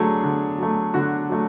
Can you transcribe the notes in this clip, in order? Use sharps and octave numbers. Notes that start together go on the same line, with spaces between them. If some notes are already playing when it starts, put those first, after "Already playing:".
Already playing: D3 F#3 A3 D4 G#4
D3
F#3 A3
D3 F#4
F#3 A3